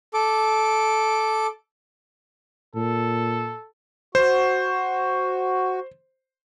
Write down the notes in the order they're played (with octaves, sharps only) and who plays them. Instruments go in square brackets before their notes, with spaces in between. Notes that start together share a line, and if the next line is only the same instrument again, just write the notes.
[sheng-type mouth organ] A4 D6
[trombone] A#2 [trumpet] A4
[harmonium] F#4 [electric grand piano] C5